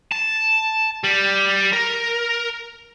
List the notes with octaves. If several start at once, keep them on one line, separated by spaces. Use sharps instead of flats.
A5
G3
A#4